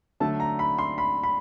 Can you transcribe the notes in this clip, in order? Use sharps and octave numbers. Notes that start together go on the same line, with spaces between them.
D3 F#3 A3 A5
A#5
B5
C6
B5
B5